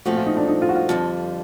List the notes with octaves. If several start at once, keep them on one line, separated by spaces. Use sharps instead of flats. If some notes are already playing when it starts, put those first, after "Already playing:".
A#2 F3 A3 C4 F#4
F4
D#4
D4
D#4
F4
F#4
F4
F2 D3 G3